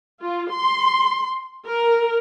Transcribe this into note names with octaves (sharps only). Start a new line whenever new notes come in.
F4
C6
A#4